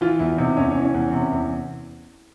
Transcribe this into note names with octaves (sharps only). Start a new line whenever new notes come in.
E3 F4
E2 E4
C3 D#4
E2 C#4
C#4
E3
C#4
E2
C#4
C3
E2